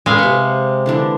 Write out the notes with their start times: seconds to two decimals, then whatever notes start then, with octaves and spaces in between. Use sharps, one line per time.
0.06 G#3 B4 F5
0.19 C3 C#6
0.86 D3 E3 D4